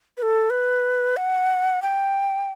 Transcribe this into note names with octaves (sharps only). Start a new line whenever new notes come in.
B4
A4
B4
F#5
G5